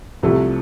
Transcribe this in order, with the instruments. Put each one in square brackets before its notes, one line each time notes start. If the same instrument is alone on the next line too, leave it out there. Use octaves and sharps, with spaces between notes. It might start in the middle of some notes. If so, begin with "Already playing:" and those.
[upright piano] C2 C3 F3 A3 A4